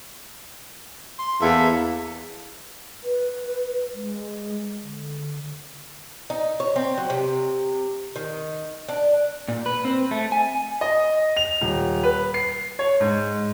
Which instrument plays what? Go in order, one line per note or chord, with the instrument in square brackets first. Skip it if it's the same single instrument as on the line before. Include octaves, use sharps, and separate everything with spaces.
[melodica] C6
[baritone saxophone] E2 [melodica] A#3 A4 E5
[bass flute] B4
G#3
D3
[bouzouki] D#4
C#5
C4
F#3
C3
D#3
D4
[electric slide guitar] A#2
B4
C4
A3
G#5
[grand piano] D#5
F7
D#1
B4
C7
C#5
G#2